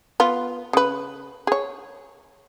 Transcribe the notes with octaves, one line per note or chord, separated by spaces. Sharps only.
B3 F4
C#3 B4
G#4 C#5